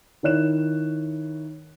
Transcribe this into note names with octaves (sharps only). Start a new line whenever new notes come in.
D#3 E4 C#5 F#6 E7